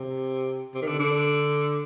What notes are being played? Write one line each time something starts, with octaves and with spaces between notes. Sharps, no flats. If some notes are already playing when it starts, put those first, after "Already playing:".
Already playing: C3
C3
D#3
D3
D3